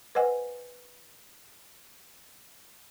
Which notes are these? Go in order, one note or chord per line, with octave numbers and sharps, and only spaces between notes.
B4 C5 D#5 F#5 G#5